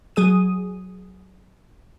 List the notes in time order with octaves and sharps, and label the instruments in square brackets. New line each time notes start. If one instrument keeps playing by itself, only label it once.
[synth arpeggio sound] F#3 G#4 D#6 D#7